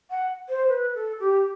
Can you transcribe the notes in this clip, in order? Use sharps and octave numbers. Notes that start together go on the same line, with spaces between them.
F#5
C5
B4
A4
G4